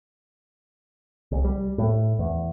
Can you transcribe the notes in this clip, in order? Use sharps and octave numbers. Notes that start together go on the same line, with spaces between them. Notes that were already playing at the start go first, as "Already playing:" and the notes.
C2
G3
A2
E2